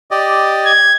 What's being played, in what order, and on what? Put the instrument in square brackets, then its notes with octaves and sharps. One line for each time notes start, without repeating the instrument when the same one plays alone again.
[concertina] G4 D5 D#5
[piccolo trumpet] G#6